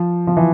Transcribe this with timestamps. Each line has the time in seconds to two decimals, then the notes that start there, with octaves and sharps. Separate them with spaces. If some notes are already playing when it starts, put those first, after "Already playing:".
Already playing: F3
0.27 F3
0.37 E3